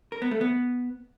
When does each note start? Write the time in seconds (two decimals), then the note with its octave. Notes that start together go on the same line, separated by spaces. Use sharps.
0.12 A#4
0.22 B3
0.31 A3
0.41 B3